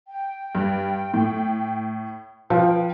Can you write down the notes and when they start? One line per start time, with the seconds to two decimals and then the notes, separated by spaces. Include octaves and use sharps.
0.08 G5
0.55 G2
1.14 A2
2.50 F3 F4 B4 G5